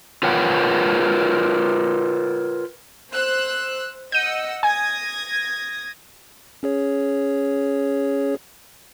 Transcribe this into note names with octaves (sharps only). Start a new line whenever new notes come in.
F4 A#4 B4 C#5 F#5 G5
C5 E6 F#6
D#5 F#5 E6 G6 D#7
G#5 D#6 G#6 A#6
C#4 G#4 C#5